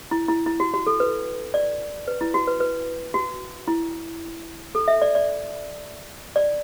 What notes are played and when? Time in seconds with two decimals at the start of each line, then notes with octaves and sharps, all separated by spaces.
0.11 E4
0.28 E4
0.46 E4
0.60 F#4
0.74 F#4
0.87 A4
1.00 B4
1.54 D5
2.08 B4
2.21 E4
2.34 F#4
2.47 B4
2.60 B4
3.14 F#4
3.68 E4
4.75 A4
4.88 E5
5.02 D5
5.15 D5
6.36 D5